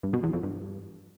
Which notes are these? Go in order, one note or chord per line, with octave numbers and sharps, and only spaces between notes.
G2
B2
E2
F2
G2